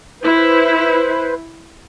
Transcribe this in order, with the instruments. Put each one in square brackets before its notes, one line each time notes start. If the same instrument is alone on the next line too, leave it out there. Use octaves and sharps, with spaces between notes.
[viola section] E4 [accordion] B4 C5